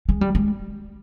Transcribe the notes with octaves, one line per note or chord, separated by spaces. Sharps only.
G#3
G3
G#3